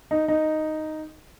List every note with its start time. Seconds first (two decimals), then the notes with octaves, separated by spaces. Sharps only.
0.11 D#4
0.28 D#4